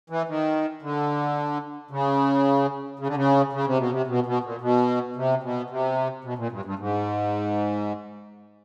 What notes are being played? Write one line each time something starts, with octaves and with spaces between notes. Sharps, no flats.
E3
D#3
D3
C#3
C#3
D3
C#3
C#3
C3
B2
C3
B2
B2
A#2
B2
C3
B2
C3
B2
A#2
G2
G2
G#2